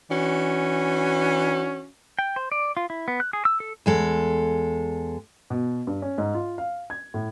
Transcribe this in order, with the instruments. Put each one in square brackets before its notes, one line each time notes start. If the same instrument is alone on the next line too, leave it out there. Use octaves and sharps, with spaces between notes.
[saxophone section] E3 C#4 D4 F#4
[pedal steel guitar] G5
C5
D5
F4
E4
B3
F#6
G#4
E6
A4
[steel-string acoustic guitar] E2 G#3 A4
[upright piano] B2
G2
C#4
G#2
F4
F5
G#6
A2